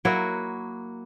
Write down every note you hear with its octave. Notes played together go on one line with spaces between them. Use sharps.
F#3 A#3 E4 F#4